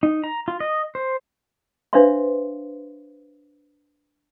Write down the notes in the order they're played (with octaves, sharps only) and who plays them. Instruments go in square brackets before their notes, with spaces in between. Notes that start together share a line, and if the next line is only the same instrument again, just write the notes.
[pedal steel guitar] D#4
A#5
F4
D#5
C5
[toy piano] D4 B4 C5 E5 F5 C6